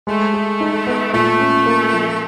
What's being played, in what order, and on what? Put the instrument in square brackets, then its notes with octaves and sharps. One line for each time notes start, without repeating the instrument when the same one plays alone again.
[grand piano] G#3 [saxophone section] A3
[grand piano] G#4
D#4
B3
[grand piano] A#2 [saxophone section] A3
[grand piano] C#4
A#3
F3